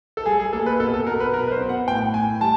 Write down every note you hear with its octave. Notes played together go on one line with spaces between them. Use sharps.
A4
G3 G#4
G#4
A#3 A4
B4
B2 A4
A4
B2 A#4
B4
F#3 A#4
B4
C5
B3
F#5
A2 G5
A2 G#5
G3 A5